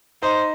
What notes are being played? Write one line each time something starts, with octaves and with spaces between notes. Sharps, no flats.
D#4 C5 D#5